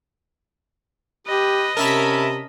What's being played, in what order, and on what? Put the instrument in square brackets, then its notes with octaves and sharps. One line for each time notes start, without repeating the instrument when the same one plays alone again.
[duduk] G4 [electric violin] B4 [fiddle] D#5
[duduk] C3 [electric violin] C#4 A5 [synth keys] A#4 E5 B5